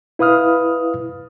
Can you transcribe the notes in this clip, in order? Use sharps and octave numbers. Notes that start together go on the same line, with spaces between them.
E4 B4 F5 D#6 F6